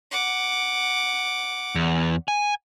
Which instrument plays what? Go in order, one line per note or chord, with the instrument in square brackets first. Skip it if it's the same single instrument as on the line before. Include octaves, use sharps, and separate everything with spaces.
[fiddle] F#5 D6
[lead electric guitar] E2
G#5